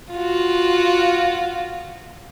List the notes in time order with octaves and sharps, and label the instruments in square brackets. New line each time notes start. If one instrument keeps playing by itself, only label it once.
[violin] F4 F#4